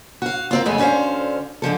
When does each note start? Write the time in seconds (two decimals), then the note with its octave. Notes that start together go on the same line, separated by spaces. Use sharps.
0.22 F#4 F5
0.51 A#3 C4 F4
0.66 F2 C#3 G#3 A3 B3 G#5
0.78 D2 D3 C#4 C5 F5
1.62 G#2 D3 F3 A4